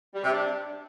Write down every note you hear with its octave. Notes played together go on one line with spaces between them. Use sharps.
G3
C3
D4